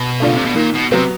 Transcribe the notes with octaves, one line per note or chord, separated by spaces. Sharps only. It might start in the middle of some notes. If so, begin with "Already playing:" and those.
Already playing: B2
C#3 A3 D4 F4
C3
B2
A#2 D#3
B2
C3 F#3 B3